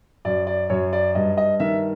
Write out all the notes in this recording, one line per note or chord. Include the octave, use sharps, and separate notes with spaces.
F#2 D5
D5
F#2 C#5
D5
G2 D#5
D#5
D#3 E5